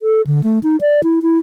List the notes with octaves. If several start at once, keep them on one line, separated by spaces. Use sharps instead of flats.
A4
D3
A3
D#4
D5
E4
E4